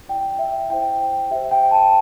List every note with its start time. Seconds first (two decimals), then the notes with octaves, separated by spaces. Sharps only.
0.09 E4 G4 D5 G5
0.39 E5
0.70 E4 C5 G5
1.30 G4 C5 E5
1.51 G5
1.71 A5